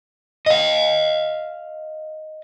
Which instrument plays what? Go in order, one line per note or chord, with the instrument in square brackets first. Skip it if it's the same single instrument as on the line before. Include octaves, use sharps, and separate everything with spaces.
[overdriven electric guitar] D#5 F5